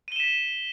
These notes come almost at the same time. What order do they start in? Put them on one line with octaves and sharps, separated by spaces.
D#7 G7 E7 B6